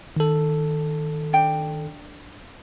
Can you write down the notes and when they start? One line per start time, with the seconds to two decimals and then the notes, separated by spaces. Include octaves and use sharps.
0.16 D#3 A4
1.33 D4 G5